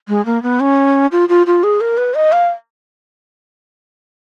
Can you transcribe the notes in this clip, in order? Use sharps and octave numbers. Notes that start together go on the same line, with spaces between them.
G#3
A#3
B3
C#4
F4
F4
F4
G#4
A#4
B4
D#5
F5